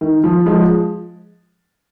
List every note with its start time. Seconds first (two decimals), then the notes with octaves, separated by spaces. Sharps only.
0.01 D#3
0.24 F3
0.46 F3 G#3